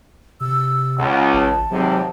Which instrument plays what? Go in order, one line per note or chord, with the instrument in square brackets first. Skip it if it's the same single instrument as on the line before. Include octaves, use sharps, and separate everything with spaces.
[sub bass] C3 [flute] E6
[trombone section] C#2 [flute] F#5
[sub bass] A1 [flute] A5
[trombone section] G#1 G#2 C3 [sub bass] F#3